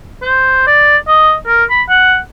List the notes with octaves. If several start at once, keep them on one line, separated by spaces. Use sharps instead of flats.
C5
D5
D#5
A#4
B5
F#5